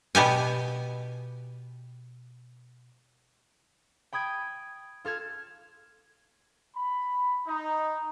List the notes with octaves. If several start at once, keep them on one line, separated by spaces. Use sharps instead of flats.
B2 B3 G4 G#5
G5 B5 D#6 G#6 D7
F4 A4 F6 G#6
B5
D#4